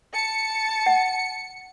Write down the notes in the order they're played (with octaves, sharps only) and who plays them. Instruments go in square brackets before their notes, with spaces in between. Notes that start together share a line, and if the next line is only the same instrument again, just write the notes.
[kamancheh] A5 [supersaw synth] C#7
[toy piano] F#5